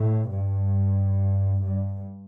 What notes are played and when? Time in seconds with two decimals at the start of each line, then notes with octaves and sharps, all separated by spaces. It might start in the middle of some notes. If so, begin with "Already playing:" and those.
Already playing: A2
0.31 G2
1.64 G2